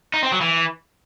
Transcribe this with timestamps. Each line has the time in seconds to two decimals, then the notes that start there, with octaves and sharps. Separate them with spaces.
0.14 D#4
0.23 C4
0.32 F#3
0.41 E3